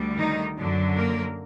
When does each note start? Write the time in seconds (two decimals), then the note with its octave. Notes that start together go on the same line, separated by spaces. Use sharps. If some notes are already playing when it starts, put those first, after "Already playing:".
Already playing: D2 D3 G3
0.17 D#3 D#4
0.57 F#2 D3 F#3
0.96 A#3 A#4